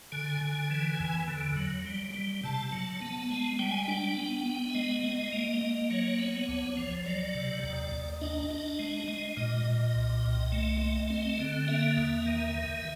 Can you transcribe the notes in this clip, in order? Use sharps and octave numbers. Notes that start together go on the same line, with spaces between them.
D3 G#5
D3
E3
E2
D3
F#3
G3
G3
C3 A5
F#3
B3
G#3
G3 G5
G#5
D4 G5
B3
B3
E5
G#3 D#5
G#3
A#3
A#3
F#3 C#5
B3
D2
F3
F#3 D5
C3
D#2
D#2
D4 D#5
D4
G#3
G#3
A#2 D#5
A#2
C2
C2
A3
A3
C4
D3
A#3 E5
D#2
D#3
D#3